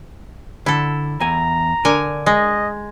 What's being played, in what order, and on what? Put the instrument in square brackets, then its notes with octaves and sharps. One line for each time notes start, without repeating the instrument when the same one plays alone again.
[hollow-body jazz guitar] D3 [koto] E4 A4
[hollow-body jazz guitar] E2 G#5 [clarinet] A#5
[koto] D3 G#5 [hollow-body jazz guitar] A#4
[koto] G#3 [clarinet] D#5